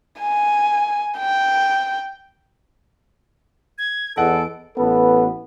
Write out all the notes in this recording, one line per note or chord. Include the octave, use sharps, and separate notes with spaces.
G#5
G5
G#6
E2 A4 D#5 F#5 D7
A1 B3 A4 B4